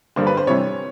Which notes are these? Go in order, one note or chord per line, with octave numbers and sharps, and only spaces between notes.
G2 D3 G3 A#3 D4 C5
B4
C5
C3 E3 G3 C#5